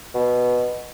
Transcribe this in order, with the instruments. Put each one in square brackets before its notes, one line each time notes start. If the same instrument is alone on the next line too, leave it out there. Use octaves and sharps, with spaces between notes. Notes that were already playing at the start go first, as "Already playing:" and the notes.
[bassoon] B2